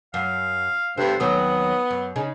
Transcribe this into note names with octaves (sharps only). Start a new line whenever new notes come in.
F#2 F5
G2 D3 B3 C5
D#2 F#3 B3 C4 D#6
F#2
C#3 C#4 D#4